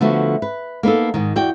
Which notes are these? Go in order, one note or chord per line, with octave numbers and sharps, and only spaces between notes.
D3 F3 A3 B3 F#4
B4
A#3 B3 D#4 A4
G#2 D#3
E2 F#4 D5 G5